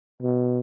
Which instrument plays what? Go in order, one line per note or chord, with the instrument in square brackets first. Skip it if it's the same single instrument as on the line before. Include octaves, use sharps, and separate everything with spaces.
[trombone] B2